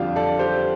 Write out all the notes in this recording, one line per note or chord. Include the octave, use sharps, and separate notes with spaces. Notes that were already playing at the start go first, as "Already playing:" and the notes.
Already playing: F2 D3 G3 D4 F4 G4
A4 D5
G4 C5